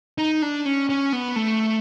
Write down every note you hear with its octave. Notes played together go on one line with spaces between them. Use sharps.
D#4
D4
C#4
C#4
B3
A3